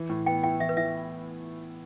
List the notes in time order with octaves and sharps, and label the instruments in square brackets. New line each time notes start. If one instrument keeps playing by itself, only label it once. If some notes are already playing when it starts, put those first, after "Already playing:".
Already playing: [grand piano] E3
A2
[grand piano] B3 [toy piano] G5
[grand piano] E4 [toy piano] G5
[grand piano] E3 [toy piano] E5
[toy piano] B4
[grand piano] E3 [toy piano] E5